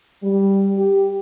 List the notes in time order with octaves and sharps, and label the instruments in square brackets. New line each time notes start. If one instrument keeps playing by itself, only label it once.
[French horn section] G3
G4